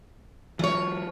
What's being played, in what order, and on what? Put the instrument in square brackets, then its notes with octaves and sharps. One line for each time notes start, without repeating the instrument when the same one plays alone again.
[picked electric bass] E3 F#3 [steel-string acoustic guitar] F4 C#5